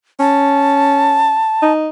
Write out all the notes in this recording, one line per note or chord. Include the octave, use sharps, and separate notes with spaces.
C#4 A5
D#4